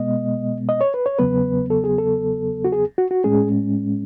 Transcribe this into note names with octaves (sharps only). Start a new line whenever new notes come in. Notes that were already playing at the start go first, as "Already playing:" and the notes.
Already playing: B2 G#3 B3 D#5
D#5
C#5
B4
C#5
E2 C#3 F#3 B3 B4
A4
G#4
A4
F#4
G#4
F#4
F#4
A2 G#3 C#4 G#4